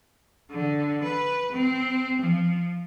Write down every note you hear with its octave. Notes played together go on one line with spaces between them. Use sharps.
D3
B4
C4
F3